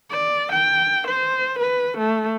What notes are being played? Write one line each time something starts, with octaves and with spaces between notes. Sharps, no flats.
D5
G5
C5
B4
A3